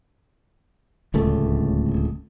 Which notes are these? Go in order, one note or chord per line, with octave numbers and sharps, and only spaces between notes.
D1 C#2 A3